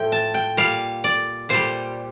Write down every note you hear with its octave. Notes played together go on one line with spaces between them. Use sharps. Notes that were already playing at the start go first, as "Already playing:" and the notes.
Already playing: A2 F3 A3 G5
A5
G5
A#2 G3 F5
D5
A#2 G3 C5